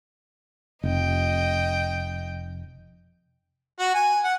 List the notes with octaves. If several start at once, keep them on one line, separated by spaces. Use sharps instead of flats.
F1 D#5 G5
F#4
G#5
F#5